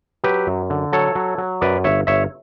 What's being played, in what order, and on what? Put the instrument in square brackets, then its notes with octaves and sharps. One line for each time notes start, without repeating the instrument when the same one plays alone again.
[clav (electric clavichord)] F#3 G4 B4
F#2
D3
F#3 A4 C#5
F#3
F#3
F#2 B4 D5
G1 C#5 E5
G1 C#5 E5